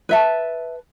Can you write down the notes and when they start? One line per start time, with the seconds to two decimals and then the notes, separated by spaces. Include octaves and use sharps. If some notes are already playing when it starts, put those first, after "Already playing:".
0.09 B4 E5 A5